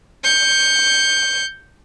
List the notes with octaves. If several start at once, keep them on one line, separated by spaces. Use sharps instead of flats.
G6 C#7